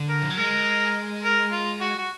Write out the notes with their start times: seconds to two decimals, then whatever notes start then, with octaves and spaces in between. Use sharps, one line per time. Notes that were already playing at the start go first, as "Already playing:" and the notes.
Already playing: D3
0.09 A#4
0.22 F3
0.30 F#3
0.37 G#3 A#4
1.24 A#4
1.52 F4
1.81 F#4
1.99 F#4